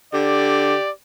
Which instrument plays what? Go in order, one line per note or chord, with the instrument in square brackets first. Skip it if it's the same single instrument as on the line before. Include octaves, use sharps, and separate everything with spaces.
[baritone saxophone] D3 [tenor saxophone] G4 [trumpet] D5